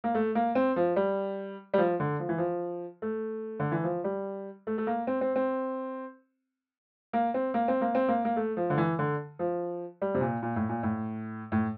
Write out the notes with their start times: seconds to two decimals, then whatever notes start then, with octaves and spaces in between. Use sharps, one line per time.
0.04 A#3
0.15 A3
0.35 A#3
0.55 C4
0.76 F3
0.96 G3
1.74 G3
1.78 F3
2.00 D3
2.19 F3
2.29 E3
2.38 F3
3.02 A3
3.60 D3
3.72 E3
3.84 F3
4.04 G3
4.67 A3
4.78 A3
4.87 A#3
5.07 C4
5.21 C4
5.36 C4
7.13 A#3
7.34 C4
7.54 A#3
7.68 C4
7.81 A#3
7.95 C4
8.08 A#3
8.25 A#3
8.36 A3
8.57 F3
8.70 D3
8.78 E3
8.99 D3
9.39 F3
10.02 G3
10.15 C3
10.21 A#2
10.43 A#2
10.56 A2
10.69 A#2
10.83 A2
11.52 A2